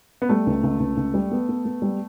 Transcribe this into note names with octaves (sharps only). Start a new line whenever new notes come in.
B3
G3 A3
C#2
C#2
C#2
C#2
G3
B3
B3
B3
G3